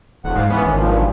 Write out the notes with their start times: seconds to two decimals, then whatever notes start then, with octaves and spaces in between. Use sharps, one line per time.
0.24 D#1 A#2 F#5
0.36 G#2 F5
0.50 E3 B3 C#4
0.66 G#1
0.77 G2 A#2 F3